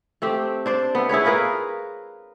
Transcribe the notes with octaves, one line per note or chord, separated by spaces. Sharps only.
A3 C4 G4
D4 C5 D5
B3 E5
E4 G#4 B4 C#5
F4 G#4 A#4 B4